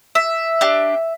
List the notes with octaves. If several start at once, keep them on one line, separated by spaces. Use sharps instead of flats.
E5
D4 G4